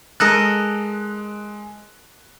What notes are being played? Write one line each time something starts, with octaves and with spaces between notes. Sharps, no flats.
G#3 A4 A#4 D#5 F#6